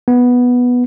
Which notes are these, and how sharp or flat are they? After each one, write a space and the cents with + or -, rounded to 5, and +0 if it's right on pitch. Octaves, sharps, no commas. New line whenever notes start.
B3 -5